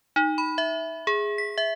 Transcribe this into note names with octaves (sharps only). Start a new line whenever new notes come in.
D#4
B5
E5
G#4
B6
E5